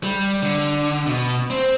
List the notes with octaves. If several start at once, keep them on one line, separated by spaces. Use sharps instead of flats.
G3
D3
B2
C4